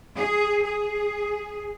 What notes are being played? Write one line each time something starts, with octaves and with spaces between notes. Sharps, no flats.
G#4
G#4